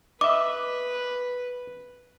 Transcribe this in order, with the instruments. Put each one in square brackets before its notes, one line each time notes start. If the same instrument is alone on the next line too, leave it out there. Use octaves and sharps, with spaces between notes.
[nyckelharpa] B4 [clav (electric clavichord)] D#5 E5 [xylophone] D6